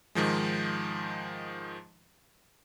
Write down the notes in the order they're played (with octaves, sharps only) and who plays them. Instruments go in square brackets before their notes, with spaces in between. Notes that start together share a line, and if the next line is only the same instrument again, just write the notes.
[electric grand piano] G#2 D#3 F3 G#3